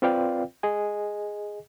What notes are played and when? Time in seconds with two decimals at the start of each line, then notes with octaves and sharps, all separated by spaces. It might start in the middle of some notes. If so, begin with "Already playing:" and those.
0.02 C4 F4 B4 D5 F5 G5
0.63 G#4 D#5 G#5